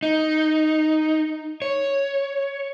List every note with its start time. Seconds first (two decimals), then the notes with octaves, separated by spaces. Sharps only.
0.03 D#4
1.62 C#5